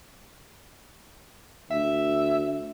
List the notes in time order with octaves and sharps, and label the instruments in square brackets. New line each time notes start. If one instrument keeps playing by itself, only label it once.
[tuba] D2 [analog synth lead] E5